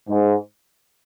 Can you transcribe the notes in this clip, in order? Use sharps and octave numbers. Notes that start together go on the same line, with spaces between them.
G#2